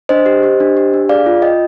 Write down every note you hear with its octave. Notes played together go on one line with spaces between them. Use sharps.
D4 C5 D#5
G4
G4
D4
G4
D4
G#4 D5 F5
F4
F4 D#5 G5